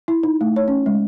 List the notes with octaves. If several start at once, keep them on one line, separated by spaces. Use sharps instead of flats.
E4
D#4
A3
C#5
C#4
G#3